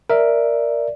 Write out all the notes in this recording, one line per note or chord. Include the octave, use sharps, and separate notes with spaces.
A#4 D5 E5